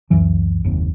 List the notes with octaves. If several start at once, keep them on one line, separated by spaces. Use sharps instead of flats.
C#2 F#2 E3 F#3
F#1 D#2 C3